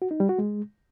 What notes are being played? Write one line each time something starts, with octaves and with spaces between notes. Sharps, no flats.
F#4
D#4
G3
F#4
G#3